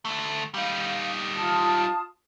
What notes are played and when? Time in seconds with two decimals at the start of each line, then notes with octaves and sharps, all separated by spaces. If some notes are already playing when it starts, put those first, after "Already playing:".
0.05 D2 A3
0.54 G3 D#4 F5
1.37 F4 A5 D#6